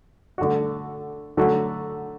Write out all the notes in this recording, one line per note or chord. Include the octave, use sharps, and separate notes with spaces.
D3 A3 F#4
D3 F#3 A3 F#4